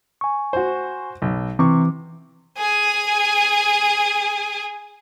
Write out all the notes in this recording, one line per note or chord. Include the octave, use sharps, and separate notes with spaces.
G#5 C#6
F#4 C5
B1
C3 E3 C4 C#6 D6
G#4 G#5